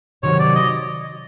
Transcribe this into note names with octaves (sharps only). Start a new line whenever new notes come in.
C3 D#3 F#3 C#5
D5
D#5